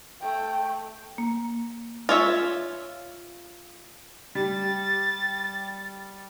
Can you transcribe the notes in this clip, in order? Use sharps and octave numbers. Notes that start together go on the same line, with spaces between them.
A3 G5
A#3
F4 C#5 E5
G3 A6